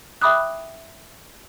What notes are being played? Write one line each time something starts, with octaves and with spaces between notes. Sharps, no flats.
E5 G5 B5 D6 D#6 F#6